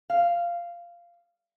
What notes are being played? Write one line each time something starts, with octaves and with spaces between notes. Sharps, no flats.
F5